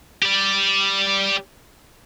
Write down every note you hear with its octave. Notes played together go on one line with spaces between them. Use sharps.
G4 D5